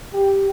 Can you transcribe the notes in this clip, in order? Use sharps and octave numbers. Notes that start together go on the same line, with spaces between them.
G4